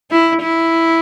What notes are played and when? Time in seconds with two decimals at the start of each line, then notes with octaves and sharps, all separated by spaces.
0.11 E4
0.42 E4